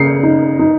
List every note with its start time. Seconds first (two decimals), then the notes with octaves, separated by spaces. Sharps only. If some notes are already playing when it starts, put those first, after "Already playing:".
Already playing: C#3 C7 C#7
0.23 D#4
0.59 D#4